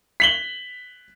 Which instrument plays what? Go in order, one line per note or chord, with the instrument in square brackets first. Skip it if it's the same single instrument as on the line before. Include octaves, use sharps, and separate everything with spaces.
[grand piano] B6 F#7 G7